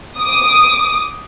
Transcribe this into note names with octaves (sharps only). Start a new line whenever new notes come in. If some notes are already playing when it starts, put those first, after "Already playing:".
D6 D#6